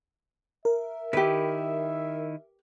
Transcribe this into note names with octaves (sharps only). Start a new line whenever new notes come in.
A#4 E5
D#3 E4 G4 B4